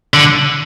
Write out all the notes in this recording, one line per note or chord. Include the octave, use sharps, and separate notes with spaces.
D3